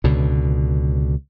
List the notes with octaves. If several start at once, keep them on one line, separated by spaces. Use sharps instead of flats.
C#2 B2 D3